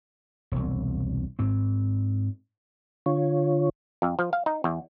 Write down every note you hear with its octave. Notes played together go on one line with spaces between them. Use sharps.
E1 C2
G#2 C4
D3 F4 C#5
F2
F3
F5
D#4
E2